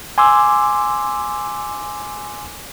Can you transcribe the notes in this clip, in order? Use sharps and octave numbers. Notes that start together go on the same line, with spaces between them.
G#5 C6 D6 E6